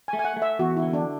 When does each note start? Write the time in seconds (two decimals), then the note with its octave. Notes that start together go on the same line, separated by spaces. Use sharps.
0.08 G#5
0.13 A3
0.19 G#5
0.25 F#5
0.37 A3
0.42 E5
0.59 E2 F#4
0.77 E4
0.82 D3
0.93 D4